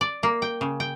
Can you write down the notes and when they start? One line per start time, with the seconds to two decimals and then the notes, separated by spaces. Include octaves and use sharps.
0.01 D5
0.23 A#3
0.42 G5
0.61 C#3
0.80 G5